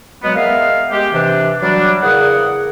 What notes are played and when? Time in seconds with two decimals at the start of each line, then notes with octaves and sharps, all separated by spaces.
0.23 B2 F#3 G#3 B3
0.35 G#3 B3 A#4 E5 F5
0.91 G#3 G4
1.13 C3 E3 D4
1.62 F#3 G3 D4
2.03 E2 C#3 G#4 A#4 F#5